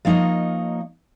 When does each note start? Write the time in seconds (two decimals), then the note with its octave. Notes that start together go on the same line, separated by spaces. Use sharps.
0.05 F3 A#3 D#4 C#5 D#5